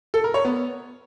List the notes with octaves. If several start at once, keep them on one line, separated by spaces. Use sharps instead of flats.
A4
A#4
C#5
B3